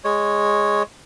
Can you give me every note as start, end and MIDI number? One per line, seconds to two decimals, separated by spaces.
0.04 0.83 56
0.04 0.83 73